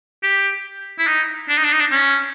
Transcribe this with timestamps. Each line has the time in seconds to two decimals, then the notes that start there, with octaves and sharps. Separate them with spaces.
0.23 G4
0.99 E4
1.07 D#4
1.49 D4
1.57 D#4
1.65 D4
1.73 D#4
1.80 D4
1.91 C#4